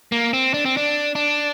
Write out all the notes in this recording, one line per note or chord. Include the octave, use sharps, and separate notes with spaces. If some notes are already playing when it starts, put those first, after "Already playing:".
A#3
C4
D4
C4
D4
D4